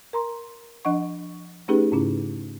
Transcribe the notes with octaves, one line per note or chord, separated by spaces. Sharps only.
A#4 A#5 C6
F3 D4 D#5 F#5 C#6
A3 C#4 D#4 G4 G#4 B4
G#2 C#3 C#4 E4